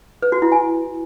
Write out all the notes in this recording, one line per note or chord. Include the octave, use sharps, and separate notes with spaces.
B4
F#4
E4
G#5